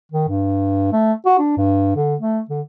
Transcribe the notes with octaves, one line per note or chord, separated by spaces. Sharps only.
D#3
G2
A3
F#4
D4
G2
D3
A3
D3